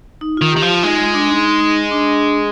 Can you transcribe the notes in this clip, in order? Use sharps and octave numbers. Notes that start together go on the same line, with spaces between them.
D#4
D#3 F4
D#3 G4
F3 F4
F4
G#3 D#4
F4
D4
D#4
D#4
D#4
D4
D4